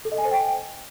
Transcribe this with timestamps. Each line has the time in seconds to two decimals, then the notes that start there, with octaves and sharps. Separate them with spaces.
0.05 A4
0.12 D#5
0.18 G#5
0.25 C5
0.31 G5